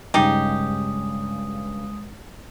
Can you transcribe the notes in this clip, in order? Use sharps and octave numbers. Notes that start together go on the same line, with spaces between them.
G2 C#3 G#3 D#4 G4 D#6